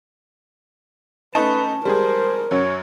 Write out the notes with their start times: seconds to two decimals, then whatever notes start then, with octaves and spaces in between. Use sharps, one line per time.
1.35 A3 C#4 D#4 B4 A5 C#6
1.85 G3 G#3 G#4 A#4 C5
2.51 F#2 F#3 C#5